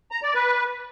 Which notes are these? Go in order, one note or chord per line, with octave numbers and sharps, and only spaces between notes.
A#5
D5
B4